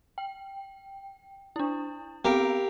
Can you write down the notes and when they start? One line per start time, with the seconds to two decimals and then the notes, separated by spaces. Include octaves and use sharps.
0.18 G5
1.56 D4 E4
2.25 B3 C4 G4 A#4 F5